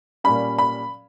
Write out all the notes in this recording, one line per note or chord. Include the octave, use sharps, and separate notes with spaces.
A#2 G3 C#4 B5
B5